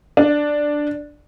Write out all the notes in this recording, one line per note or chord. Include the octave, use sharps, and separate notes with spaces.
D4